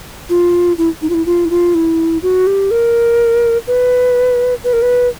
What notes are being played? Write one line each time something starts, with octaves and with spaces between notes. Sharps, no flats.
F4
E4
D#4
F4
E4
F4
E4
F4
E4
F#4
G4
A#4
B4
B4
A#4
B4